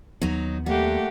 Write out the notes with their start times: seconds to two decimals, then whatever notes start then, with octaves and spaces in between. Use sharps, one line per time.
0.22 D#2 F#3 B3 D#4
0.66 G3 A3 A#3 G4 F#5